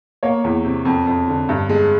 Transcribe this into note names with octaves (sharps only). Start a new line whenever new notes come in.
A#3 C#5
E2
C3
F2
F2
D3
G2
G#3